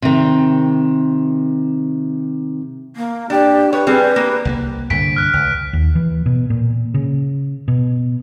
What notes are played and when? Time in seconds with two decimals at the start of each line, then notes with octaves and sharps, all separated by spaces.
0.02 C3 D#3
2.96 A#3
3.30 D4 G4
3.73 B4 C#5
3.87 G3 C4 G#4 B4
4.16 A#3
4.45 C2 F#3 A#3
4.90 C2 G2 D3 B6 D7
5.16 F6 F#6
5.33 C#2
5.73 D#2
5.95 E3
6.26 B2
6.50 A#2
6.94 C#3
7.68 B2